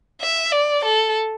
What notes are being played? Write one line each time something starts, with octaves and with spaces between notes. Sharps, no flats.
E5
D5
A4